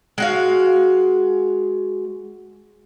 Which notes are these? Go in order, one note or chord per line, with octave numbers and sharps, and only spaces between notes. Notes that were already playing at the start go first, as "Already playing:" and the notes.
G#3 F#4 F5